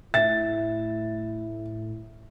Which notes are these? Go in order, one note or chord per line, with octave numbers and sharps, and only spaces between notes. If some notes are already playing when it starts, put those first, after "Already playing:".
A2 E4 E5 A6